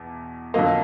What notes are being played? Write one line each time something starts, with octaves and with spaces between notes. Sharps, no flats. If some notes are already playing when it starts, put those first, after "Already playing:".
Already playing: E2 B2
F2 D3 F#3 A#3 D#5 F5